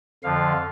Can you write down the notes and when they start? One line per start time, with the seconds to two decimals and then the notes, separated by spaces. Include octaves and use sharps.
0.23 F2 D3 F3 F5